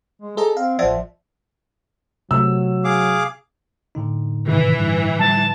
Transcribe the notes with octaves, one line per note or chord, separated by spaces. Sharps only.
G#3
G#4 A4 D#5 A#5
C4 F5
A1 F3 C5 D5 E5 F#5
C3 F#3 A3 E6
G#4 F5 D6
A2 D3 D#4
G#2 C3 D#3 E3
G2
F3 G3 A5